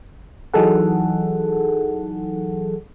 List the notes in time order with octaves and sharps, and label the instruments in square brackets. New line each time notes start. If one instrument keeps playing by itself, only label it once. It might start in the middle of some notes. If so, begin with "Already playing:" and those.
[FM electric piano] E3 F#3 D#4 G#4 A4 F#5